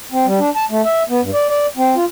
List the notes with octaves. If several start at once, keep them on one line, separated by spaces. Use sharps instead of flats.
C4
G3
D4
A5
A3
E5
B3
G2
D5
D5
C4
F4